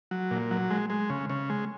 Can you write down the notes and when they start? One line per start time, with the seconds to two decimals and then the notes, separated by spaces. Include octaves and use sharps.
0.11 F#3
0.31 A#2
0.51 F#3
0.70 G#3
0.90 G#3
1.10 C#3
1.30 C#3
1.50 G#3